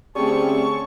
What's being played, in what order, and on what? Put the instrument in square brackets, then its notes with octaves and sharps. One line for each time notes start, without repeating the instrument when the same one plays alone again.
[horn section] D3 G#4 A5 [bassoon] G3 [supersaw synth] A3 C4 C#4 [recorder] C#6